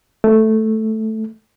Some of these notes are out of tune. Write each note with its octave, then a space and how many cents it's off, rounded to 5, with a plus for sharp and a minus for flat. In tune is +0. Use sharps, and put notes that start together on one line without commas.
A3 +0